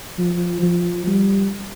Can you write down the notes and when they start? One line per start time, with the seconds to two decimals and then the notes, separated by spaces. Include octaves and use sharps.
0.19 F3
0.63 F3
1.07 G3